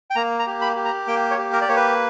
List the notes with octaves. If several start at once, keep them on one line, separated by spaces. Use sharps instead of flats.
G5
A#3 A#5
A#5
G4
B5
G4
A#5
A#3 G5
C#5
G4
A#4
D5
A#3 C#5
B4